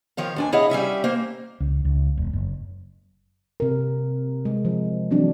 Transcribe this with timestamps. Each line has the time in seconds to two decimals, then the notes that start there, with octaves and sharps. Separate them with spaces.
0.17 D#3 F3 C#5 F5
0.36 D#2 D4 G#5
0.52 E4 G#4 C#5 D#5 F5 F#5
0.70 G3 C#4 E5 F5
1.04 A#3 C5
1.60 C#2
1.85 C#2
2.17 E1
2.33 F#1
3.60 C3 A#4
4.45 G#3
4.65 F3
5.10 E3 F#3 C4 D4